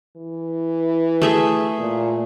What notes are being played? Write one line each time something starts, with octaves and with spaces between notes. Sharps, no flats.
E3
A3 G#4 E5
A#2